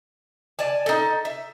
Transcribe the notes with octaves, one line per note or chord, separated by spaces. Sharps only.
D5 G#5 A5
D#4 A4
E5